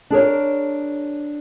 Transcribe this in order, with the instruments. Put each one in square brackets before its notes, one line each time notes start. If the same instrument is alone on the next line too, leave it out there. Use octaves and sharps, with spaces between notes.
[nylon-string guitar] D4 G#4 A#4 C#5